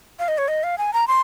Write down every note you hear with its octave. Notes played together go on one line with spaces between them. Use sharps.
F5
D#5
C#5
D#5
F5
G#5
A#5
C6